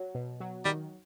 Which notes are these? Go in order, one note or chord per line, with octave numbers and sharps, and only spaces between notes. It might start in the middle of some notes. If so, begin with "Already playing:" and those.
Already playing: F#3
B2
F#3
D#3 G3